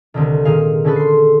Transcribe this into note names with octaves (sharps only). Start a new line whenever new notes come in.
C2 D3 D#3
A#2 D#3 G#4 F5
D3 C#4 G#4 A4 B4
C6 C7